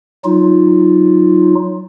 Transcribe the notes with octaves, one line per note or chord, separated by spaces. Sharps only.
F#3 D#4 F4